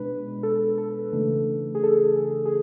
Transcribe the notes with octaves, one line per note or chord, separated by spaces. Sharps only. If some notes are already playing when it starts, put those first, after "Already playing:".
Already playing: B2 G#3 D4 B4
A4
A4
C#3 E3 A3 D4 A4
G#4
A4
G#4